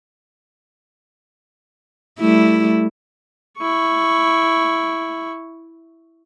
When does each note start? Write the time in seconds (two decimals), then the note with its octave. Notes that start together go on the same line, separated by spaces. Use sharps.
2.20 G3 A3 E4
3.59 E4 C#6